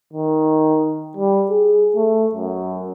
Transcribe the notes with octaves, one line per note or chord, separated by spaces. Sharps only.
D#3
G3
G#4
A3
F#2